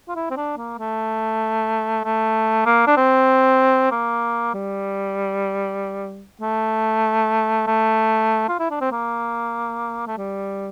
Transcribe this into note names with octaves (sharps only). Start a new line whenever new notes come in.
F4
E4
C4
D4
A#3
A3
A3
A#3
D4
C4
A#3
G3
A3
A3
F4
E4
D4
C4
A#3
A3
G3